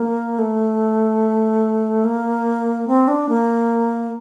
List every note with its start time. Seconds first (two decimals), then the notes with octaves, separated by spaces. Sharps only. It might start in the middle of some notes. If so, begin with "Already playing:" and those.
Already playing: A#3
0.39 A3
2.04 A#3
2.88 C4
3.08 D4
3.29 A#3